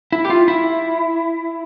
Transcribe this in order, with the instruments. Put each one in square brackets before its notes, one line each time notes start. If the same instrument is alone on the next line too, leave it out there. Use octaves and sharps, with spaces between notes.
[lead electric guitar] E4
G4
F4
E4